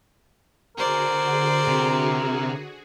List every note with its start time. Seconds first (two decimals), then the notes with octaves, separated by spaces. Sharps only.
0.77 D3 F#4 G#4 A#4 C5 D5
1.67 C3